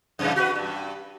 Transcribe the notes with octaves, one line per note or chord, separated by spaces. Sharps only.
F#2 C#3 E3
F#4 B4
G2